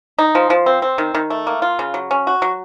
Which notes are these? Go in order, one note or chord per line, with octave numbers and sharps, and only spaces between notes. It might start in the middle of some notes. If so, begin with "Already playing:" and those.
D#4
F3
F3
C4
C4
D#3
D#3
A3
A#3
F4
C#3
F#3
C#4
F#4
F#3